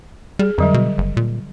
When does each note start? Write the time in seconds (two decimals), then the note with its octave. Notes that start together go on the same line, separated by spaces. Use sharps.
0.39 G3 G#4
0.58 F2 D3 F#3 G3
0.74 B2
0.98 F#1
1.17 A#2